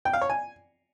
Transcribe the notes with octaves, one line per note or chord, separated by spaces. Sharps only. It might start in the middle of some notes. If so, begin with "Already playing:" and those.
G5
F5
C#5
G#5